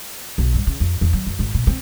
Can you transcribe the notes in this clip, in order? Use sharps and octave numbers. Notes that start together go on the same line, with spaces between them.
B1
G2
C#3
F2
E2
F#3
F#2
G#1
B2
C4